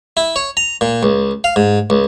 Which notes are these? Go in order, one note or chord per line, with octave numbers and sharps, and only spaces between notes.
E4
C#5
A#5
A#2
C#2
F5
G#2
C#2